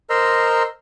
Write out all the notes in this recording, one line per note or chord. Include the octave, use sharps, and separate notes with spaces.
A#4 C5 D#5 A#5 C6 E6